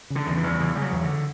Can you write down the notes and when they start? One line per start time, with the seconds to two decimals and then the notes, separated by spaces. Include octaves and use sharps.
0.10 C#3
0.15 D3
0.27 E2
0.37 E3
0.43 E2
0.54 F#3
0.60 C#3 E3
0.75 C#3 G3
0.82 F#3
0.92 E2
1.04 D3